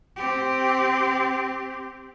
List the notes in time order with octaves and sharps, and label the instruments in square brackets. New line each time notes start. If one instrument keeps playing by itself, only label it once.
[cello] C4 G4